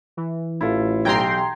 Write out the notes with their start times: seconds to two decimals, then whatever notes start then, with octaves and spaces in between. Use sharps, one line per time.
0.17 E3
0.61 A1 E4 F4 A4
1.05 B1 G4 G5 A#5 C6 G#6